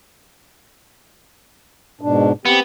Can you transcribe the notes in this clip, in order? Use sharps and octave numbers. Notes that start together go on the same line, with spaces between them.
G#2 B2 D4
B3 C4 G4